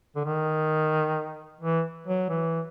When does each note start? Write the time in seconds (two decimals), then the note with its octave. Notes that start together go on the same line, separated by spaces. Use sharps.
0.16 D3
0.25 D#3
1.61 E3
2.07 F#3
2.29 E3